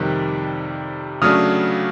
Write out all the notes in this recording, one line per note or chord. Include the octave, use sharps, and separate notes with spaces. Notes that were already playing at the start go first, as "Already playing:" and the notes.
Already playing: F2 C3 D#3 G3 F#6
C#3 F#3 A3 D4 D#6 F6